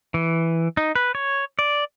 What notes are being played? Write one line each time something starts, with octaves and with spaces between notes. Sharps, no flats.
E3
D#4
B4
C#5
D5